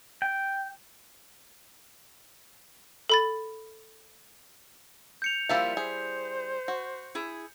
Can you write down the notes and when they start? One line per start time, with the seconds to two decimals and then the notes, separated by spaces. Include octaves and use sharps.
0.22 G5
3.09 A4 B5 A6
5.22 G6 C#7 F7
5.49 F3 G3 A#3 E4 F4 E5
5.77 G#4 C5
6.68 F#4
7.15 E4 G#4